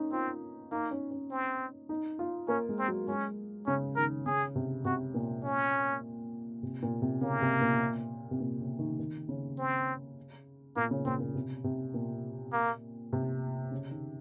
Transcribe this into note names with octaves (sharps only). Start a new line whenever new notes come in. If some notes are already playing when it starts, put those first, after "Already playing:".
Already playing: A#3 C#4 D#4
C4 F4
A#3 D#4
C#4
C#4
C4
D#4
F4
A#3 C#4
G#3
C4
F#3
G#3 C#4
C#3 C#4
D#3 A#4
C#3 G#4
C3
C3 F#4
A#2
C#4
C3
A#2
C3
C#3 A#3
C3
A#2
C3
A#2
C#3
D#3
D#3
C#3
C4
A#2 A#3
C#3
A#2 C4
A#2
C3
C3
A#2
A#3
C3
C#3
D#3